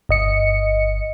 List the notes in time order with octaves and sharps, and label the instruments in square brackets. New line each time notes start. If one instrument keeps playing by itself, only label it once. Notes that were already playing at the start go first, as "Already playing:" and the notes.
[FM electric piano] G1 D#5 C#7